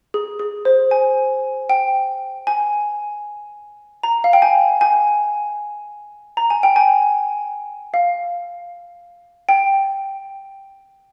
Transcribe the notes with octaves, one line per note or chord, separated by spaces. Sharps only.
G#4
G#4
C5
G#5
G5
G#5
A#5
F5
G5
G#5
G#5
A#5
G#5
G5
G#5
F5
G5